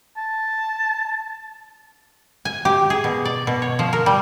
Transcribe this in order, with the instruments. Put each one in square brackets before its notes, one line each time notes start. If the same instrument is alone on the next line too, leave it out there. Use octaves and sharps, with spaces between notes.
[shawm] A5
[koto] G#5
G4
G#4
B2
D5
B2
C#5
F3
A#4
G3